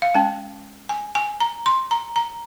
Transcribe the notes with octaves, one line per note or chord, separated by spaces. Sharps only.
F5
G#3 C#4 G5
G#5
G#5
A#5
C6
A#5
A#5